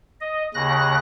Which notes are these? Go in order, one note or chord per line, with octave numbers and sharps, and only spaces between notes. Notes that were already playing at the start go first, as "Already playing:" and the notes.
D#5
D#2 C#3 F#6 A#6